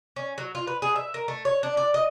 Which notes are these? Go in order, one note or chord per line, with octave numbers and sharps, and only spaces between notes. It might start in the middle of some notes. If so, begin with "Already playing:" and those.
C#4
F#3
F4
B4
G#4
E5
A#4
A3
C#5
D4
D5
D#5